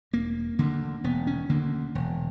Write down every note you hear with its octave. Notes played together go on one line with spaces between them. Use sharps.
E1 A#3
D2 D3 A#3
E1 B3
C#4
D2 D3 A#3
E1